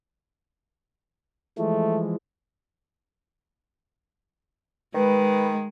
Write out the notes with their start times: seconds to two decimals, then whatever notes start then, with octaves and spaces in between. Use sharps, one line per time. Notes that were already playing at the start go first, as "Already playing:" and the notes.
1.58 E3 F3 G#3 A3
4.94 D#3 G#3 B4